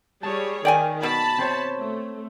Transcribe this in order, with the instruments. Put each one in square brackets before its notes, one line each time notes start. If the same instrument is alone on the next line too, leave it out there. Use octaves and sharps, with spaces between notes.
[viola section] G3 G#4 C#5 [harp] A5
[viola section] D#3 [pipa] D5 G5 G#5
[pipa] B2 [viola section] A5 B5
[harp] C4 C5 C#5
[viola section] A3